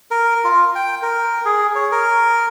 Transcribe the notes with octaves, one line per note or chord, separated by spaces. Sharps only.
A#4
F4
G5
A#4
G#4
C#5
A#4